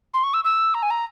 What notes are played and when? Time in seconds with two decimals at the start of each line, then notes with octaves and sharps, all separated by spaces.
0.14 C6
0.23 C#6
0.34 E6
0.44 E6
0.74 A#5
0.82 G#5
0.90 A#5